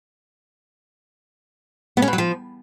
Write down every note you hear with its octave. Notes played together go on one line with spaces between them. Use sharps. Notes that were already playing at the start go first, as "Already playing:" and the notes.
B3
C#4
B2
F#3
F3